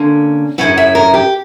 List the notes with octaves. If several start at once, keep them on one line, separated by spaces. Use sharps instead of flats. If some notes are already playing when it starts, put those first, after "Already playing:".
Already playing: D3 A#3 C#4
F#2 C#3 F#3 C#4 E4 F#5
E5
A#4
G4